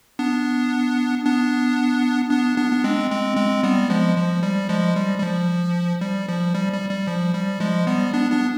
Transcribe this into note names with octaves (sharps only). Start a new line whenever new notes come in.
B3 D4
B3 D4
B3 D4
B3 D4
B3
G#3 C4
G#3 C4
G#3 C4
G3 B3
F3 G#3
F3
G3
F3 G#3
G3
G3
F3
G3
F3
G3
G3
G3
F3
G3
F3 G#3
G3 B3
B3 D4
B3 D4